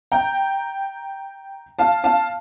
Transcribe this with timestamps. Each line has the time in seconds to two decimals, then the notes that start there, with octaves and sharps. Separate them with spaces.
0.12 G5 A#5
1.79 F5 A5
2.04 F5 A5